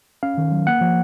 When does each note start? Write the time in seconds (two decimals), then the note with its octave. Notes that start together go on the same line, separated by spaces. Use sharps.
0.23 C#4 F5
0.38 D#3
0.52 F#3
0.67 A#3 F#5
0.81 F3